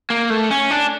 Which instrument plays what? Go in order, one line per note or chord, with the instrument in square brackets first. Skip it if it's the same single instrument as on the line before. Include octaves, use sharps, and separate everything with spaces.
[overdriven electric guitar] A#3
A3
C#4
D4